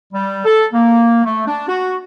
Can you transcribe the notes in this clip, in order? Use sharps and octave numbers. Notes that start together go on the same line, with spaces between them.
G3
A4
A#3
A3
D4
F#4